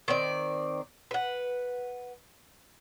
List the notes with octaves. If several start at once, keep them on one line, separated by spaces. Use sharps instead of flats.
D#3 C4 D5
B4 F#5